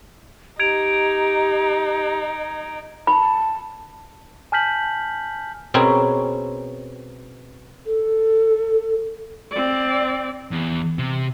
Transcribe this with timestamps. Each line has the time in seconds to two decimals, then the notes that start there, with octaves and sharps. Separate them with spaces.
0.60 D#4 G4 G#6 D7 F7
3.07 A5 B5
4.52 G#5 A5 F6 G6 B6 F#7
5.74 B2 C4 C#4 G#4 A#4
7.86 A4
9.51 C4 D5
10.51 E2
10.98 C3